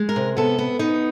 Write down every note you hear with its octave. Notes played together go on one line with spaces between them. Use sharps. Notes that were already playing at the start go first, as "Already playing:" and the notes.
Already playing: G#3
A#4
C3
B3 A4
B3
B3 D#4